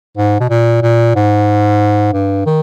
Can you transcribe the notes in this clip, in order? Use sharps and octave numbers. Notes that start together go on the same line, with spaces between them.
G#2
B2
A#2
A#2
G#2
G2
D#3